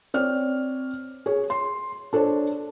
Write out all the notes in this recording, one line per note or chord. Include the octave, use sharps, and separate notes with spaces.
C4 C#5 D5 F6
G#4 C#5
C6
D4 A4 C5 C#5 A5